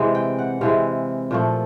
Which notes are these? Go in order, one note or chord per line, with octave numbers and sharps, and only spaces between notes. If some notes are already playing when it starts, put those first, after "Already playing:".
Already playing: C3 E3 G#3
G5
F#5
C3 E3 G#3 F5
A#2 F3 A3